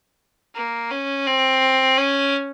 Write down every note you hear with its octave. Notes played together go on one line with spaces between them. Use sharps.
A#3
C#4
C4
C#4